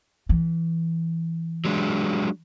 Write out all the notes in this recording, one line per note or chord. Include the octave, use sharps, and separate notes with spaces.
E3
F#3 G#3 D4